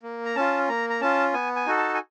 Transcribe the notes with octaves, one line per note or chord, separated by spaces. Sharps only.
A#3
A#5
C#4 F4 A5
A#3 A#5
A#5
C#4 F4 A5
B3 G#5
G#5
D#4 F#4 A4
A5
G#5